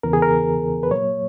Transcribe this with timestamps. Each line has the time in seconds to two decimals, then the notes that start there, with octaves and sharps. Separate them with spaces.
0.03 E2 C#3 E3 B3 A#4
0.13 G#4
0.22 A#4
0.83 B4
0.90 A#2 F#3 A#3 C#5